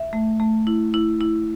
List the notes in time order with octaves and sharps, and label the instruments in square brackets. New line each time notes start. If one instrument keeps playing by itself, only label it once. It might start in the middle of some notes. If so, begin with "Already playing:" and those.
Already playing: [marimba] E5
A3
A3
E4
E4
E4